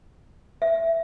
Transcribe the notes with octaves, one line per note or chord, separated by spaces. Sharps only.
E5